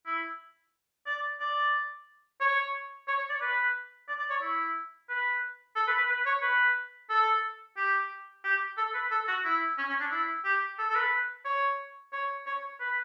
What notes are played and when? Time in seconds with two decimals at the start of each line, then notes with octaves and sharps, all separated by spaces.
0.06 E4
1.06 D5
1.40 D5
2.40 C#5
3.08 C#5
3.18 C#5
3.30 D5
3.41 B4
4.08 D5
4.19 D5
4.30 C#5
4.42 E4
5.09 B4
5.75 A4
5.87 B4
5.98 B4
6.09 B4
6.26 C#5
6.42 B4
7.10 A4
7.77 G4
8.44 G4
8.77 A4
8.94 B4
9.11 A4
9.28 F#4
9.44 E4
9.78 C#4
9.89 C#4
10.00 D4
10.11 E4
10.45 G4
10.78 A4
10.89 A4
10.96 B4
11.45 C#5
12.13 C#5
12.47 C#5
12.80 B4